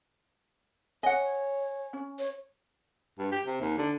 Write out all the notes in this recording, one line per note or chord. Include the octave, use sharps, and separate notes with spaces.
C#5 D#5 F#5 G#5
C#4
C#5
G2
G4
C3
D#2
D3